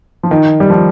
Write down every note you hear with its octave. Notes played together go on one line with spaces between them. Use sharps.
F3
D#3
G3
F3